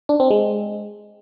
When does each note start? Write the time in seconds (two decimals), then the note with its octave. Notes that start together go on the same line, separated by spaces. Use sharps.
0.09 D4
0.20 C4
0.31 G#3